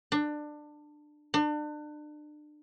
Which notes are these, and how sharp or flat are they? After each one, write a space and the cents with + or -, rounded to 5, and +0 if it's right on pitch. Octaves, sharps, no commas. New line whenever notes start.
D4 +20
D4 +35